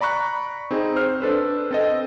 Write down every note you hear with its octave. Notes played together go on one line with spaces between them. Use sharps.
D5 A#5 B5 C#6 F#6
C4 D#4 G#4
C5 F6
D4 A4 B4 C5
C4 A4 D#5